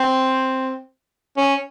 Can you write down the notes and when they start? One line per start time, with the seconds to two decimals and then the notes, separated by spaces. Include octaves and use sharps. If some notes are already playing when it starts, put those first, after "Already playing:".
Already playing: C4
1.37 C#4